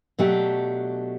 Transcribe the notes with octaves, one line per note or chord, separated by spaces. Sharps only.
B2 F#3 A3 D4 G4